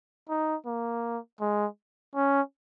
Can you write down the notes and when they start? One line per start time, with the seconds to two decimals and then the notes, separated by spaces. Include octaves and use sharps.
0.29 D#4
0.66 A#3
1.41 G#3
2.15 C#4